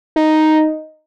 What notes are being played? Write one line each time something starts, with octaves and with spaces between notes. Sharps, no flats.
D#4